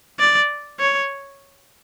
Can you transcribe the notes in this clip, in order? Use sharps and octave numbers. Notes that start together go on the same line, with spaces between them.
D5
C#5